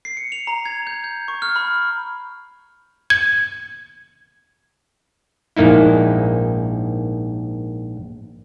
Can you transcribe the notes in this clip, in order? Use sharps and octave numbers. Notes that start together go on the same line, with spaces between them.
C7
C#7
F7
A#5
G#6
G6
G6
C#6
F6
B5
F6
G#6
A#1 G#2 A#3 D#4 E4